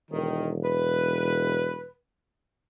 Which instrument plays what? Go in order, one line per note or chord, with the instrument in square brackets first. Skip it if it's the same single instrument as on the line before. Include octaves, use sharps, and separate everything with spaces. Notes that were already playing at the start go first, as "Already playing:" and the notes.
[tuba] E1 [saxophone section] D#3
[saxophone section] B4